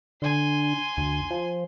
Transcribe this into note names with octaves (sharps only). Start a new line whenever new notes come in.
D3 G#5 C6
D2
F3